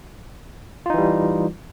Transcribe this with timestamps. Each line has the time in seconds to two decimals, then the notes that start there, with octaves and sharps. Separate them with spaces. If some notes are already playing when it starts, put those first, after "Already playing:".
0.86 F4
0.90 D#4
0.94 E3
0.98 G3